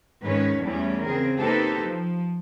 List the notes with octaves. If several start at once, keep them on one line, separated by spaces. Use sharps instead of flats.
G#2 D#3 C#4 B4 C#5
E2 E3 G3 A3 C#4
C#3 C4 G#4 A#4
A#3 D#4 G4 A4 B4 C5
F3